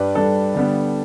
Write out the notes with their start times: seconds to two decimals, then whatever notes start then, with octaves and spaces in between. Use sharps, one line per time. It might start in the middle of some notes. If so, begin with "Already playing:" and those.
Already playing: G2 G3 D4 B4
0.15 G2 G3 D4 A4
0.54 D3 G3 B3 D4